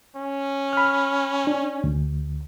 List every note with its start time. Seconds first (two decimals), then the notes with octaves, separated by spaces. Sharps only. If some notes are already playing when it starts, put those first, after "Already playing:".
0.16 C#4
0.73 B5 F6
1.47 D4
1.84 D2